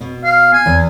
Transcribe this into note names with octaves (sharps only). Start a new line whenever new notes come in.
B2
F5
G#5
E2